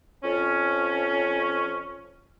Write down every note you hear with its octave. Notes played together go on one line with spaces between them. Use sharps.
F2 F3 C#4